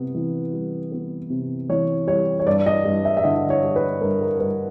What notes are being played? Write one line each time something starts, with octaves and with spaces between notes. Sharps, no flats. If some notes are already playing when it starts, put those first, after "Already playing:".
Already playing: C3 B3
E3
G3
B3
C3
E3 C#5
G3 C#5
C#5
G2 D5
D#5
G2
E5
E5
D3 D#5
C#5
G3
B4
G2 A#4
A#4
G2 B4